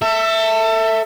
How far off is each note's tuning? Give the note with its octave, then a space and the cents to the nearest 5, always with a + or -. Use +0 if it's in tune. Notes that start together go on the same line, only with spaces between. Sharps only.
A4 +30 E5 +0